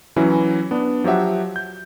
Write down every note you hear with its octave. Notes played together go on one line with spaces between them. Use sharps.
E3 F#3 C#4 E4
B3 D4
F3 F#3 G4 E5 F#5
G6